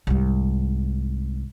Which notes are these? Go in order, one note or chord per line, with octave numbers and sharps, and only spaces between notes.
C2 G#2